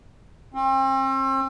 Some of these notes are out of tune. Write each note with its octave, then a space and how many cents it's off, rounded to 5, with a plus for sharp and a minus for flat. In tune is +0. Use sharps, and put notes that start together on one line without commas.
C4 +40